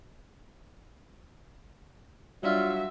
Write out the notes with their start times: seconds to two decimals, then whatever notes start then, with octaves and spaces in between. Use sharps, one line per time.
2.43 F#3 G3 D4 F4 E5